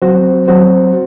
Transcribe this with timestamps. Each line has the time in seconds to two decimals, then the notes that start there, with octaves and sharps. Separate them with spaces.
0.02 F#3 C4 F#4 C5
0.48 F#3 C4 F#4 C5